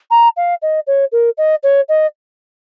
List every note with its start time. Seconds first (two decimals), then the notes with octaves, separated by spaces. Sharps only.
0.10 A#5
0.36 F5
0.62 D#5
0.87 C#5
1.12 A#4
1.37 D#5
1.63 C#5
1.88 D#5